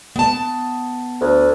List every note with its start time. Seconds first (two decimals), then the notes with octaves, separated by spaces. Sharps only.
0.16 B3 A5
1.21 D2